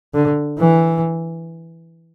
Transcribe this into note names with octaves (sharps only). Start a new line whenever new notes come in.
D3
E3